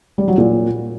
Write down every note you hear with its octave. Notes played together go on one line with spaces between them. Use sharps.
G3
F#3
A#2